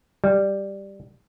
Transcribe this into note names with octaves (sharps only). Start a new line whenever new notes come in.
G3